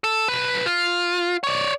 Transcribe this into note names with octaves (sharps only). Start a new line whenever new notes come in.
A4
B1 B4
F4
C#5 D5